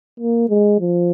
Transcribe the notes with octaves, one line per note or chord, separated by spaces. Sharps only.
A#3
G#3
F3